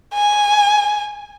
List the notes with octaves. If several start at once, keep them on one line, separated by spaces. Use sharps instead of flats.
G#5